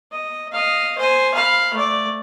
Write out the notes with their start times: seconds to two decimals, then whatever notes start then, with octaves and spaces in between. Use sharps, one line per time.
0.12 D#5
0.52 D#5 F5
0.98 C5 G#5
1.34 F5 B5
1.74 A3 D5